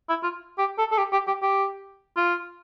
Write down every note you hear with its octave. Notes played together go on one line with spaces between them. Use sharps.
E4
F4
G4
A4
A4
G4
G4
G4
G4
F4